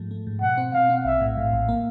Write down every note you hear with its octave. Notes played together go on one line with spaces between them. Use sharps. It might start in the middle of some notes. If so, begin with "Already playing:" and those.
Already playing: G#2 F3 A3
A3
G#2
B2 F#5
C4
B2 F5
C4
A#1 E5
A2
A2 F5
A#1
A#3